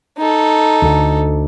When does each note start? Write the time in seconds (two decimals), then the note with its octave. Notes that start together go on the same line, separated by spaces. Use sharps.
0.18 D#4 A4
0.82 D2 D3